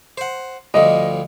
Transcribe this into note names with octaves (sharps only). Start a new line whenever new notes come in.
C5 F#5
D2 F3 G3 D#5